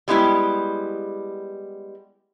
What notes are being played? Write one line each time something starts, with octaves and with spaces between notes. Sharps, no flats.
G3 G#3 B3 E4 G4